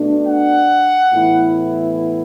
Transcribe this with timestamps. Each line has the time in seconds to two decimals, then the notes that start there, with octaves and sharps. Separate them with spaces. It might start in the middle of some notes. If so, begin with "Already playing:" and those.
Already playing: B2 A3 D4
0.25 F#5
1.13 A2 E3 B3 E4